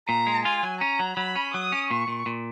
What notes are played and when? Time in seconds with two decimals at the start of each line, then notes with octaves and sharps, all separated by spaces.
0.08 A#2 A#5
0.27 G#3
0.45 F4 G#5
0.63 F#3
0.81 C#4 A#5
0.99 F#3
1.17 F#3 B5
1.36 C#4
1.54 F#3 D#6
1.72 C#4
1.90 A#2 C#6
2.08 A#2
2.26 A#2